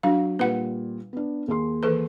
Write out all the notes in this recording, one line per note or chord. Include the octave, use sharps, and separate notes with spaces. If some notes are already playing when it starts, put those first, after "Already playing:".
F#3 D4 F5
A#2 G3 B4 F#5
B3 D4
D#2 G#4 C6
E3 A4 B4